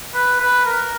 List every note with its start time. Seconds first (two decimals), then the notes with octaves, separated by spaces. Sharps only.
0.14 B4
0.39 B4
0.65 A#4